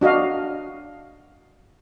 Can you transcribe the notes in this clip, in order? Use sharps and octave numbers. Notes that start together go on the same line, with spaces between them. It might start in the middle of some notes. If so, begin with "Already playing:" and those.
D4 F#4 D#5 F5